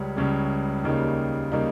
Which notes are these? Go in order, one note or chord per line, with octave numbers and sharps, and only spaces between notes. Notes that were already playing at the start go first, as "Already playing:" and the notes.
Already playing: C#2 C#3 G3 C#4
C#2 C#3 G3 C#4
D#2 C#3 G3 A#3 D#4
C#3 G3 A#3 D#4